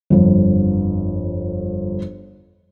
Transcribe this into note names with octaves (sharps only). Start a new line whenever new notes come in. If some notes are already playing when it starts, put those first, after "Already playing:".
G1 F2